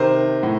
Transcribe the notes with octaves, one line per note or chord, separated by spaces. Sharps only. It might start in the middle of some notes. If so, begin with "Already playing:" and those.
Already playing: C3 D#3 A#4 C5
A2